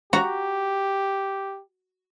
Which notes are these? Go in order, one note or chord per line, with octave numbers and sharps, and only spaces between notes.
F#4 G4 A#5